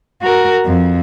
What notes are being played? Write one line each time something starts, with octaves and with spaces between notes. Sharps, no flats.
F#4 A#4
F2